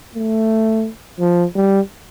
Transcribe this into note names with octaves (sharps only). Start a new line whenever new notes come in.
A3
F3
G3